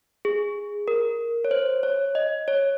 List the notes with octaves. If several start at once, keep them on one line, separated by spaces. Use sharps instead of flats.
G#4
A#4
C#5
C5
C#5
D#5
C#5